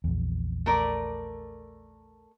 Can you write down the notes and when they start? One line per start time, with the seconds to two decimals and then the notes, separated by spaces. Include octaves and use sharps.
0.04 A#1 E2
0.66 A3 A#4 D5